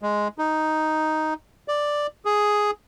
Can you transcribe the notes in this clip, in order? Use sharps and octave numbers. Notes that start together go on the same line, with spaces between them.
G#3
D#4
D5
G#4